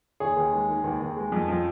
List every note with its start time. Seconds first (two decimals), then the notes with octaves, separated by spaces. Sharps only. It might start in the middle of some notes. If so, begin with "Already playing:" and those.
0.20 D#2 G#4 C#5
0.36 D#2
0.53 G#3
0.69 D#3
0.84 D#2
1.01 D#2
1.17 G#3
1.32 F2
1.48 F3